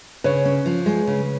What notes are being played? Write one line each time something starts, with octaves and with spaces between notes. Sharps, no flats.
C#3 B4 C#5
C#4
F3
G#3
C#3